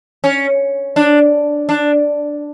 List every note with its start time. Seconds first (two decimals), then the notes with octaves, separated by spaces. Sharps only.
0.24 C#4
0.96 D4
1.69 D4